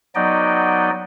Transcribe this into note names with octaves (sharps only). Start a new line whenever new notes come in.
F#3 B3 D#4 D5 D#5 G5